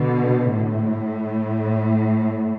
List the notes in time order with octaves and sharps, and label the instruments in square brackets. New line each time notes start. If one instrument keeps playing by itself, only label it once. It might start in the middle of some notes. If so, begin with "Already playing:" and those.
Already playing: [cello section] B2 D3
A2